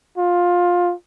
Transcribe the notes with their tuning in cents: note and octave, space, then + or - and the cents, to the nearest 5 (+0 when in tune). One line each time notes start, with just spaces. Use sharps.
F4 +15